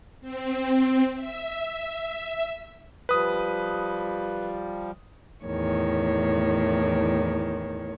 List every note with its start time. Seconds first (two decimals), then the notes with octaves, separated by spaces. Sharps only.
0.21 C4
1.15 E5
3.09 F3 G3 B4 D#6
5.45 E2 A2 D#3 C#5